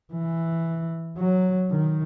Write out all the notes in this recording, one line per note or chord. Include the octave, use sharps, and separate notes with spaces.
E3
F#3
D#3